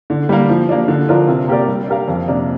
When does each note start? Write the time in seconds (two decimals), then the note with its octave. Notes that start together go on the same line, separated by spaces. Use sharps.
0.10 D3
0.29 G3 A#3
0.49 F3
0.69 A#3 D4
0.88 D3
1.08 F3 D4 F4 A#4
1.29 C3
1.48 A#3 G4 A#4 D5
1.67 G3
1.87 D4 G4 A#4 F5
2.08 F2
2.28 C3 A#3 D4